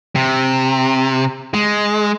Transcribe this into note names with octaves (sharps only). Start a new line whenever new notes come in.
C3
G#3